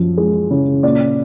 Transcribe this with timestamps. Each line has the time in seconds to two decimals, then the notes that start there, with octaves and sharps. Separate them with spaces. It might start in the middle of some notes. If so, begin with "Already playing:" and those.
Already playing: F#2 F3
0.18 G#3
0.51 C#3
0.83 A#2 D5